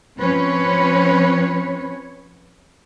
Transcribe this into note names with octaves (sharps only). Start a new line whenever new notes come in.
F3 C4 C#4 B4 C#5